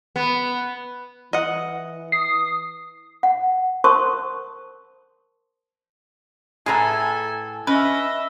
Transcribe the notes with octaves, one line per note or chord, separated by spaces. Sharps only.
B3
E3 D#5 F#5
D#6 C7
F#5
A#4 C5 A5 C6 C#6 D#6
A2 G#4 A4 B4 E5 G#5 A#5
C#4 B4 D#5 E5